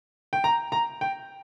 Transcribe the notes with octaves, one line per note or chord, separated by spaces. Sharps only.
G5
A#5
A#5
G5